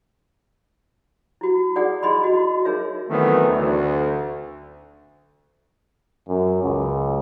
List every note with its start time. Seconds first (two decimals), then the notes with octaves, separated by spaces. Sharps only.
1.41 E4 F#4
1.76 D#4 G#4 D5 F#5 D#6
2.03 E4 G#4 D#5 B5 C6
2.24 F#4 D#5
2.65 D#4 G#4 A#4 C#5 E5
3.08 D#3 E3 F#3 A3 B3 C4
3.48 D2
6.29 F#2
6.63 C#2